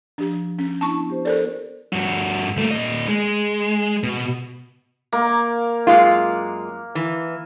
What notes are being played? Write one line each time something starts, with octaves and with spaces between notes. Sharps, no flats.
F3 D4 G4
C#4
B3 D4 E4 A5 C#6
G4 C5
A4 A#4 C5 D5
G2 F#4
A3 A#3
A#2 D#5
G#3
B2
A#3
F#2 G#3 F4
E3